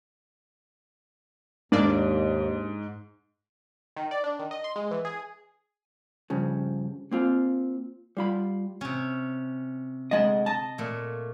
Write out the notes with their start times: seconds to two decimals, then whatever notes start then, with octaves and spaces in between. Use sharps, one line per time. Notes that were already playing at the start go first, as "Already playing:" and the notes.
1.72 D#2 G#2 A#3 D4 D5
3.97 D#3
4.11 D5
4.24 D4
4.39 D#3
4.51 D#5
4.64 C6
4.76 G#3
4.91 E3
5.05 G#4
6.30 G2 C#3 F3
7.11 A#3 C4 F4
8.17 G3 F4 B5
8.81 C3 C#4
10.11 D2 G#3 D#5 A5
10.46 D#5 A5
10.78 A#2 A3